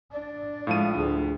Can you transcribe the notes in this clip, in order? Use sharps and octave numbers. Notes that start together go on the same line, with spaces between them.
D4 D5
A2 F3 G#3 F5 D#7
D2 D4 G#4